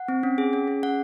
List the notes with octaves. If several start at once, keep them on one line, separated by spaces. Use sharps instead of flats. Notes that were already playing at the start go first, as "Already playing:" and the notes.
Already playing: F#5
C4
C#4
G#4
C#4
G#4
C#4 F#5